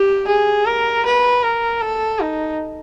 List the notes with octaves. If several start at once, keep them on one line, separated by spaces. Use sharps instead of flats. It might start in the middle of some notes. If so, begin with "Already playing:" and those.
Already playing: G4
G#4
A#4
B4
A#4
A4
D#4